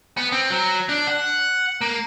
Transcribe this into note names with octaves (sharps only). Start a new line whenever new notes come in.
B3
C4
F#3
D4
F#5
A#3